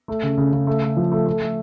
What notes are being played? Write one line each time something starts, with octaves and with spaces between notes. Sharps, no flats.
A3
C#3
C#3
C#3
A3
A3
F3
A3
A3
A3